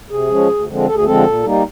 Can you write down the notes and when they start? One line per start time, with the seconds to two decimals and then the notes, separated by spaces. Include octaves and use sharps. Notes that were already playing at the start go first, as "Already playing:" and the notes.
0.09 C3 G#4
0.29 F3 G#3 C#4
0.48 D2
0.67 D3 F3 G#3 C4
0.86 D2 A4
0.95 G#4
1.05 D3 F3 G#3 C4 A4
1.24 A#2
1.43 G3 A#3 D#4